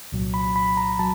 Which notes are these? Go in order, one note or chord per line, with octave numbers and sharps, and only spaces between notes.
C2 A#2 F#3
B5
B5
A#5
F#3 A5